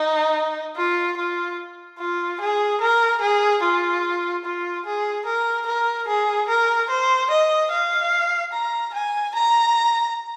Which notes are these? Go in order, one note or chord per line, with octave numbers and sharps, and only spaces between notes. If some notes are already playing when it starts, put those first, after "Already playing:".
Already playing: D#4
F4
F4
F4
G#4
A#4
G#4
F4
F4
G#4
A#4
A#4
G#4
A#4
C5
D#5
F5
A#5
G#5
A#5